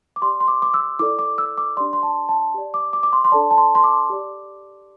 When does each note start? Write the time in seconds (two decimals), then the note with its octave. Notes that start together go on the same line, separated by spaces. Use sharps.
0.16 D6
0.22 G4 D5 C6
0.40 C6
0.48 D6
0.62 D6
0.74 E6
0.99 E4 A4 D5 D6
1.19 D6
1.38 E6
1.58 D6
1.77 D4 G4 D5 C6
1.93 C6
2.03 A5
2.29 A5
2.54 G4 D5
2.74 D6
2.93 D6
3.03 D6
3.13 C6
3.24 C6
3.32 D4 A4 D5 A5
3.51 A5
3.58 C6
3.75 C6
3.84 D6
4.10 G4 D5